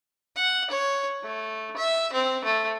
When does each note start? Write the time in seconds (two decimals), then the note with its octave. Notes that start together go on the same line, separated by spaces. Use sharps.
0.36 F#5
0.70 C#5
1.23 A3
1.77 E5
2.13 C4
2.45 A3